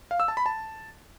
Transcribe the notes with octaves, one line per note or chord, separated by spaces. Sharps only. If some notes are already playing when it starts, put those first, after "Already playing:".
F5
E6
A5
B5
A5